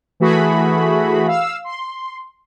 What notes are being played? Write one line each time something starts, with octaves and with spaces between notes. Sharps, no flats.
E3 A3 F#4 G#4 B5
F5 E6
C6